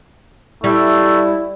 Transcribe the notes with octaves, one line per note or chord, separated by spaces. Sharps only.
G3 A3 E4